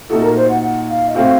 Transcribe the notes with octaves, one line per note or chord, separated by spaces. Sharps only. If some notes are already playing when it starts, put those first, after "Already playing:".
A#2 A3 D#4 F#4 A4
A#4
C5
F#5
F#5
F5
D#5
A2 A3 C4 F#4 F5